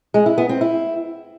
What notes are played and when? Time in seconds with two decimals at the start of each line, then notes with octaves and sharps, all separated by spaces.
0.14 G#3
0.26 E4
0.38 B3
0.49 C4
0.61 E4